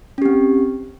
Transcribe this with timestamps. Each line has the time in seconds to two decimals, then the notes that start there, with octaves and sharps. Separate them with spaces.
0.18 C#4
0.22 G4
0.25 C4